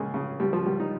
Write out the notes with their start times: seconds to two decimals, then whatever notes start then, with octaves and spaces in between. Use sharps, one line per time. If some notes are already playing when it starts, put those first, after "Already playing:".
Already playing: C#2 C#3 G#3 A#3
0.14 C#3
0.40 C#2 G3
0.53 F3
0.66 C#2 G3
0.80 D#4